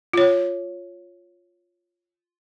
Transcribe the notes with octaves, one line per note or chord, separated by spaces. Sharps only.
F4 C#5